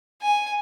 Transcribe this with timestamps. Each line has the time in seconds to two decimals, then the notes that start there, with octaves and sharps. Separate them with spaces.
0.22 G#5